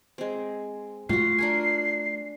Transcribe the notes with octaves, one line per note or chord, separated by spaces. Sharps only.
G#3 C4
A3 F4 F#4 C7
D4 A#4 G#5